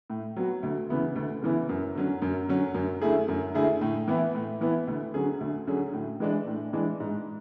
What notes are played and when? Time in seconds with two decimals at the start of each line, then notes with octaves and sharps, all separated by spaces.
0.10 A2
0.36 F#3 B3 F#4
0.63 D2
0.89 C#3 E3 B3 E4
1.16 D2
1.42 C#3 E3 B3 E4
1.69 F#2
1.95 D3 F#3 C#4
2.22 F#2
2.49 D3 F#3 C#4
2.74 F#2
3.01 D3 A3 E4 G#4
3.28 F#2
3.54 D3 A3 E4 G#4
3.81 A2
4.08 E3 B3 E4
4.35 A2
4.61 E3 B3 E4
4.87 D2
5.14 D3 F#3 C#4 G#4
5.41 D2
5.67 D3 F#3 C#4 G#4
5.94 A2
6.20 E3 G#3 D4
6.47 A2
6.73 E3 G#3 D4
7.00 G#2